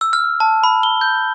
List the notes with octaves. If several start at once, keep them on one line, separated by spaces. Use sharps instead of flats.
E6
F6
A5
B5
G7
G6